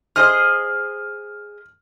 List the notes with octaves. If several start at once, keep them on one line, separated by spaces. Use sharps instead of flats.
G#4 C5 D#5 F6